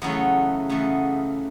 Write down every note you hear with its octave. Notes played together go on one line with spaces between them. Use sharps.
E2 C#3 F#3 A3 C#5
E2 C#3 F#3 A3